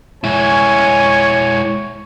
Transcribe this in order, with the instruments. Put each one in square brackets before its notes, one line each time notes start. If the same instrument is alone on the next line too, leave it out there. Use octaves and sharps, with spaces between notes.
[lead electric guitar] G#3 E4 [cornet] C#5 [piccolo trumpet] G#5